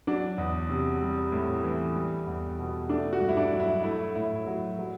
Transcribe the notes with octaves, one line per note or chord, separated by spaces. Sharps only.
F#3 D4
E2
C3
G3
A2
E3
G3
E2
B2
A3 D4
F#4
G2
E4
D4
F#3
E4
A3 E4
A2 E4
F#3
F#3